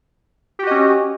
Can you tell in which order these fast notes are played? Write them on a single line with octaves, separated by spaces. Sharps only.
G4 F#4 D#5 C#4